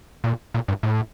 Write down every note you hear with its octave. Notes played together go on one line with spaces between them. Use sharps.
A#2
A#2
G2
A2